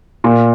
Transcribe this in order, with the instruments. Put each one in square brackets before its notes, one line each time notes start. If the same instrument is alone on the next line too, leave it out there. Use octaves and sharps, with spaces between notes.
[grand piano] A#2